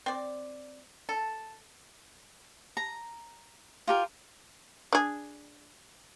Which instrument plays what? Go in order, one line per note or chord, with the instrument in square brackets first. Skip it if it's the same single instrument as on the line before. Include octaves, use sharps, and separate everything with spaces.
[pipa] C4 D5
A4
[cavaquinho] A#5
F4 G4 A#4
[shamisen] D4 G#4